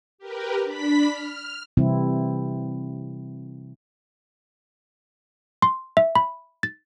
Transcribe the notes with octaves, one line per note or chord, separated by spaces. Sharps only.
G4 A#4 B4
D4 B5 B6
F6
C3 E3 G3 C4 E4
C6
E5
B5
A6